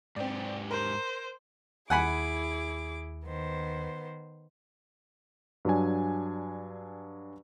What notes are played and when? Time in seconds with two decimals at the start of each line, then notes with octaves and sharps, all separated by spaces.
0.16 G#2 C4 G4 D5
0.71 A#4 C5
1.90 D#2 E4 G#4 F#5 G#5 B5 D6
3.25 D#3 B3 C5
5.65 G2 F#3 D4 G#5